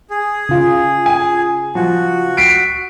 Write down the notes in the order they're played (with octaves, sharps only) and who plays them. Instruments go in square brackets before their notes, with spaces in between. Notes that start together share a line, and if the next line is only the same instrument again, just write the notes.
[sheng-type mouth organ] G#4
[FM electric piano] C#3 F4
[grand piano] G#5
[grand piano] F3 [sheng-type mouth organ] F#4
[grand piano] B6 C7 D7